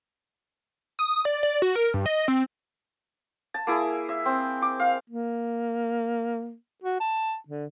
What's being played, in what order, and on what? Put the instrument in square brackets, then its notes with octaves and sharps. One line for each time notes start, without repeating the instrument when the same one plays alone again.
[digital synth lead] D#6
D5
D5
F#4
A#4
G2
D#5
C4
[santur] A5
A#3 E4 G#4
E5
C4
D6
F5
[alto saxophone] A#3
F#4
A5
D3